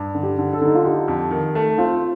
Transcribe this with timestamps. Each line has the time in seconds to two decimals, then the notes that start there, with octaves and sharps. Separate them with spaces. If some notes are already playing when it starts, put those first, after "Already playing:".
Already playing: G2
0.15 D3
0.23 G4
0.39 D3
0.53 A4
0.62 D3 D#4
0.75 F4
0.85 D#4 G4
1.08 F2
1.31 D#3
1.55 A3
1.78 C4 F4